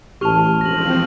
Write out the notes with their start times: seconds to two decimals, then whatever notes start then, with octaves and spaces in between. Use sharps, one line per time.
0.21 A1 G4 A5 C#6 F6 F7
0.61 E1 F3 C4 A#6 F#7